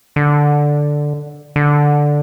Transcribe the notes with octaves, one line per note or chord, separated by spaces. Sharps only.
D3
D3